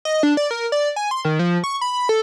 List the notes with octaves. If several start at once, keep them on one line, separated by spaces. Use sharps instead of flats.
D#5
D4
D5
A#4
D5
G#5
C6
D#3
F3
C#6
B5
A4